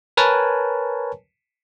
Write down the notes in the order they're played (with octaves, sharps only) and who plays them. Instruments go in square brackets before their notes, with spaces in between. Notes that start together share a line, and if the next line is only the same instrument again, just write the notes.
[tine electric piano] A#4 B4 C#5 G#5 A5